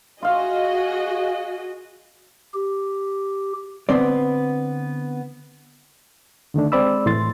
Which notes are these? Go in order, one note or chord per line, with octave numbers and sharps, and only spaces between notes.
F4 F#4 G#4 D#5 F5
G4
D3 B3 C4 D5
D3 D#3 A3 D4
G#3 C4 C5 D5 B5 E6
A2 E3 C6 A6